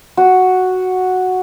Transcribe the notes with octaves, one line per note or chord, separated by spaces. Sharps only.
F#4